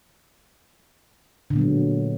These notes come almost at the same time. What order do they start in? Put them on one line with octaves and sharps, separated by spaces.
D3 A#2 B3 F#3 G#3